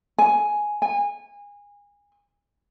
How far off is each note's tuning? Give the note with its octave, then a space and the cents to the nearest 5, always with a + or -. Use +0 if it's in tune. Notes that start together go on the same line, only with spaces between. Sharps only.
G#5 +5
G#5 -25